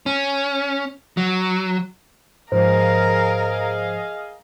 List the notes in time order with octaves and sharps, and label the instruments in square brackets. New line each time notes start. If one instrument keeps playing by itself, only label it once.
[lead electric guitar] C#4
F#3
[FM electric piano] G#2 F3 [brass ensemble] G#4 D#5 F5 [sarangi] A#4 [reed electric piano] C5